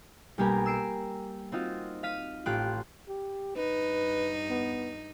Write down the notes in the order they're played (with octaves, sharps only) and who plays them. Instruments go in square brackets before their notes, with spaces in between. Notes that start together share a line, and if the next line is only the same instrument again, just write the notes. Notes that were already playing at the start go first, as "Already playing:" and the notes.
[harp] B1 G3 A#3 G4 G#5 A#5
E6 C7 D7
C4 D#4 F4 F#4
F5 B6 D#7
A1 F4 G4 C6 F#6 D7
[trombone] G4
[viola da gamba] G2 D#4 [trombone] B4
[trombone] B3